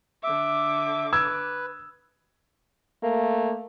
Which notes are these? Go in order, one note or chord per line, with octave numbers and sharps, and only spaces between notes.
D3 E5 D6
B4 E6 G#6
A3 A#3